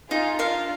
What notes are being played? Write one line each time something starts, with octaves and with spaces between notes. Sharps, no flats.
D#4 F4 G#4
D4 F4 A#4 F5